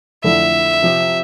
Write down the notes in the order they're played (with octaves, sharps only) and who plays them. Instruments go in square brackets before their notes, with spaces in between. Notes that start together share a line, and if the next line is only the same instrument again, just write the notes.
[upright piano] F2 D3 A3 E4 A4 [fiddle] E5
[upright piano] C3 F3 C4 G4